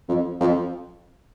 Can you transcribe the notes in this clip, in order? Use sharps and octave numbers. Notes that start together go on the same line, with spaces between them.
F2
F2